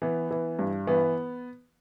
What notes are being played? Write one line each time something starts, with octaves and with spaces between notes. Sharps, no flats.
E3 B3
E3
G2
E3 B3